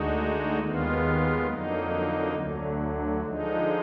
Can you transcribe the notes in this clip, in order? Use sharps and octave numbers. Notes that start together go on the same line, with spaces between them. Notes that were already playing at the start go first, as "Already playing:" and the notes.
Already playing: D2 D3 G#3 D#4 F#4
D#2 D#3 G#3 B3 F4
F2 D3 F#3 A#3 D#4
D2 D3 F#3
D3 F3 G#3 D#4